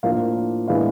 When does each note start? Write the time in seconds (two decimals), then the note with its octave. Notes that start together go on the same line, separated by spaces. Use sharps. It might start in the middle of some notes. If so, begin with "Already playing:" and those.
0.03 A2 F3 A#3 D4 F5
0.67 A2 E3 G#3 B3 D4 F5